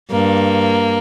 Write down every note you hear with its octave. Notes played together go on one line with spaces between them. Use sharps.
G2 A#3